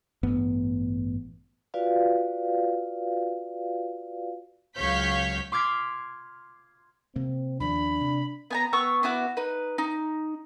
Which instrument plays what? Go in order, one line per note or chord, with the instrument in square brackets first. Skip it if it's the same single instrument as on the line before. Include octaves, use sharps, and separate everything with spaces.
[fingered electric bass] A1 G2 B3
[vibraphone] F4 F#4 B4 D5 F5
[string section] C#2 F#3 C#5 F5 G6 B6
[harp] C6 D6 F6 G#6 B6 C7
[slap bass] C3 A#3 [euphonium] C4
[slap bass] D#2 F3 [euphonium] D4 [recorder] B5
[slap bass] C3
[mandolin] B3 G#5 A#5
B3 F#5 C#6 E6
B3 E4 F#4 D6
D#4 B4
D#4